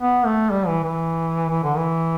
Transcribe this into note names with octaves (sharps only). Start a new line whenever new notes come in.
B3
A3
G3
E3
E3
E3
D3
E3